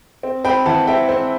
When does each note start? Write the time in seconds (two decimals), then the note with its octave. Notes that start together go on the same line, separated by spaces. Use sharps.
0.23 C4
0.45 C4 G5 B5
0.66 E3 F#5 A5
0.87 C4 E5 G5
1.09 C4